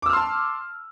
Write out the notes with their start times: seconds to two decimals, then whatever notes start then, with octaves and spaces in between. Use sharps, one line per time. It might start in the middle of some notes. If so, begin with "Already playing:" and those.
0.02 D6
0.06 E6
0.09 F6
0.13 C6
0.17 A5